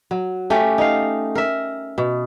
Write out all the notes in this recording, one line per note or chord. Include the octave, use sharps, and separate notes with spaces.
F#3
A3 C#4 G4
D#4 F5
A#4 E5
B2